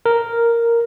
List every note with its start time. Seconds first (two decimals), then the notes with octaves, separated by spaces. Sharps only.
0.06 A#4